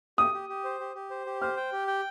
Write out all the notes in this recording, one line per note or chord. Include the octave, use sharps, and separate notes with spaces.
G4 D#6
G4
G4
C5
G4
G4
C5
G4
C5 F6
G5
G4
G5